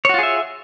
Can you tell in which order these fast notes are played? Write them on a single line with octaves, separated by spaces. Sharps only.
C#5 F#4 F4 G#4 E5